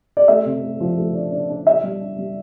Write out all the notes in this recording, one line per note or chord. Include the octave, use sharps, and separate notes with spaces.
D5
A3 E5
C3
A3
F3
A3
D4
D4
D4
D4 E5
G3
D4
G3